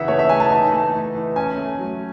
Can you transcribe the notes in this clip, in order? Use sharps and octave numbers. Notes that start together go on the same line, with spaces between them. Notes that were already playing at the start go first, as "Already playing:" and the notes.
Already playing: C#3 E3 D#4 E5 F#5
A3 C#5
E5
E3 G#5
A5
D#4
A3
E3
E3
C#4 G#5
A3
F#3